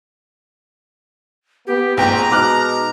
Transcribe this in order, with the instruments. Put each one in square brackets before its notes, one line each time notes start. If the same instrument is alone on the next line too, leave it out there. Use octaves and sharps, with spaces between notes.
[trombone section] B3 [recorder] G4
[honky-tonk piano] A#1 G5 [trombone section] G#2 B3 C4 [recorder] A#5
[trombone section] B2 G#3 D#4 [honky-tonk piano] D6 F6 F#6